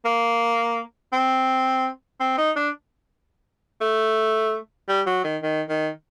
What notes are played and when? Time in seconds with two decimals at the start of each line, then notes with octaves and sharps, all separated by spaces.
0.05 A#3
1.13 C4
2.20 C4
2.38 D#4
2.56 D4
3.81 A3
4.89 G3
5.07 F#3
5.24 D#3
5.43 D#3
5.69 D#3